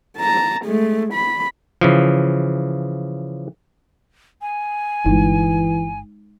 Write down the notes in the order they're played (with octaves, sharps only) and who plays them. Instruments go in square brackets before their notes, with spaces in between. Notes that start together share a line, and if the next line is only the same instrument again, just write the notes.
[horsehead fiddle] A5 A#5
G#3 A3
B5
[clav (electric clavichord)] C#3 E3 F3
[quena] G#5
[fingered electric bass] G1 [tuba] E3 [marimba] G#3 D#4